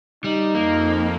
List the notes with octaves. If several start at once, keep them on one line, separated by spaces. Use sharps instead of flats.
G3 D#4
F2 A#3